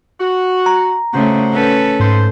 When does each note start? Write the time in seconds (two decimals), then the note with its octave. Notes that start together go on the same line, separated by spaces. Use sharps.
0.20 F#4
0.66 A#5
1.14 G2 C#3 A3 F#4 C5
1.53 C#4 A4 B4
2.00 G#2 C5